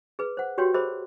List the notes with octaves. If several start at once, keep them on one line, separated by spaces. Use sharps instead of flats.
G#4 B4
C5 F#5
F#4 G4 B4 C#5 G5 C6
G#4 A#4 C5 D#5 B5